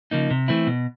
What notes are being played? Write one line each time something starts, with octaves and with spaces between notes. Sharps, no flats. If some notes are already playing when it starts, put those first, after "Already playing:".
C#3 F3 A#3 D#4
C3
E3 A3 C4 E4
B2